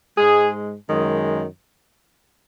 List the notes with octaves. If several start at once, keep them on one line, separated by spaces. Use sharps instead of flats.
G#2 G#3 G#4
F#2 D#3 G#3